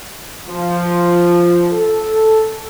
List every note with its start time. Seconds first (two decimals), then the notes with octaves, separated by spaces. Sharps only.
0.49 F3
1.71 A4